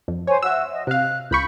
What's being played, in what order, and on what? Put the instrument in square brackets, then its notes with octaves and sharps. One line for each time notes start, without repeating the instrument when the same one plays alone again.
[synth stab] F2
[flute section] C5 G#5 [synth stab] C#5
[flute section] F#4 [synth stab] E5 E6
[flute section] D#5
[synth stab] C3 F5 [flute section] F#6
[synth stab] C#2 B5 C#6 [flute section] G6